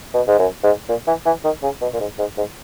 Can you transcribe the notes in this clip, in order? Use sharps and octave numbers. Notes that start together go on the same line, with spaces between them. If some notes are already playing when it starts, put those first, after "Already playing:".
B2
G#2
F#2
G#2
A#2
E3
E3
D#3
C#3
B2
A#2
G#2
G#2
G#2